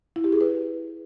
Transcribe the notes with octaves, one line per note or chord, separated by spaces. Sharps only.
E4
G4
G#4
B4